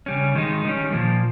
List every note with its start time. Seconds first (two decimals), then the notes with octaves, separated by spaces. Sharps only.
0.06 C#3 G3 C#4
0.35 D#3 G#3 D#4
0.65 D#3 G3 C#4
0.93 A#2 F3 A#3